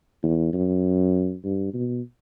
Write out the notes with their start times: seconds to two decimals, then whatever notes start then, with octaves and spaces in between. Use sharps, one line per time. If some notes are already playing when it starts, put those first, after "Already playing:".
0.23 E2
0.53 F#2
1.44 G2
1.74 B2